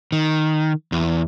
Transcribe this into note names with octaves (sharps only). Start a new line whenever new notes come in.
D#3
E2